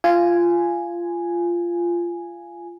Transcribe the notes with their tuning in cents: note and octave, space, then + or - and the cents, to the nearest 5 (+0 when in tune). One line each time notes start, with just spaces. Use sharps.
F4 -15 G#5 +0